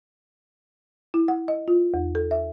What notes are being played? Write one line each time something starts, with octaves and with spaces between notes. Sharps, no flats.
E4
F#5
D#5
F4
E2
A4
E5